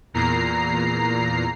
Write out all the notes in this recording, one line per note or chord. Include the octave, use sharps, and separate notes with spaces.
E2 A#2 A#5 C7